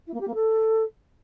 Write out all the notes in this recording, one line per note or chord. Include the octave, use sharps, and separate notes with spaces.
E4
A#3
G4
A#3
A4